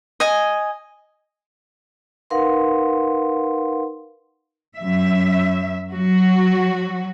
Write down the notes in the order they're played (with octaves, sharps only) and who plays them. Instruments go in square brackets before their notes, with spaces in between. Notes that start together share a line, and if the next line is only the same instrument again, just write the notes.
[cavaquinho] D#5 G#5
[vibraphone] D#4 A#4 B4 F5 F#5 C6
[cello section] F#2 E5
F#3 F#4